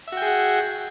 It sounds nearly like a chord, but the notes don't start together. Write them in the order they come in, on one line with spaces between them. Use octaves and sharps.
E5 F#4 G5 G#4 F#5